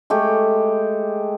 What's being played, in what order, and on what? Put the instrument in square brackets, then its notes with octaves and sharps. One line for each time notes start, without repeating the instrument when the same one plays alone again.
[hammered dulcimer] G#3 A3 G4